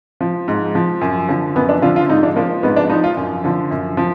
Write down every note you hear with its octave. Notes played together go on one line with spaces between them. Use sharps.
F3
G#2
F3
F#2
D3 F3
F#2 B3
D4
D3 F3 F4
F4
G#2 D#4
D4
F3 A#3
G#2 B3
D4
F3 D#4
F4
F#2
D3 F3
F#2
F3